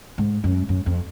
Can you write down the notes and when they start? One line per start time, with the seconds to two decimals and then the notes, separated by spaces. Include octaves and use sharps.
0.18 G#2
0.44 F#2
0.69 F#2
0.86 F2